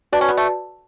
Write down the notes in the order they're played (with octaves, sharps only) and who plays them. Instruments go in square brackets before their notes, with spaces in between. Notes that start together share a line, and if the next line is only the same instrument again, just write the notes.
[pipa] D4 [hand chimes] F#4 B4 D5
[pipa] C#4
B3
A3